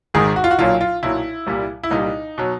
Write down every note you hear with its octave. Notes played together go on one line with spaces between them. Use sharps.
G#1 G#2 D#3 G#4
F#4
F4
F#4
B1 A#2 F#3 F4
F4
B1 A#2 F#3 E4
C2 A#2 G3
E4
C2 A#2 G3 D#4
B2 F#3